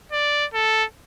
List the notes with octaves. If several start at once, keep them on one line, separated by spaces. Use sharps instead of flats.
D5
A4